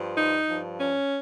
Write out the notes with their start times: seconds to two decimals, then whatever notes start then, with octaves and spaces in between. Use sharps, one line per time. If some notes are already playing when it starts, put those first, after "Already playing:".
Already playing: G2 F3
0.17 D#4
0.47 G2 F3
0.78 C#4